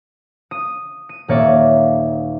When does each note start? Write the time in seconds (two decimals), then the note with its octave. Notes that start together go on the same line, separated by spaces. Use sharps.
0.51 D#6 D#7
1.09 D#7
1.28 D#1 A#3 C#5 D5 E5 D6